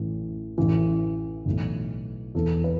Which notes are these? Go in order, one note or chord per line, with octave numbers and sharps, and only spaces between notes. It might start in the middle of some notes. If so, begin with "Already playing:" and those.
Already playing: A1 A2 E3
A1 A2 E3
B1 A2 E3
E2 E3 A4
B4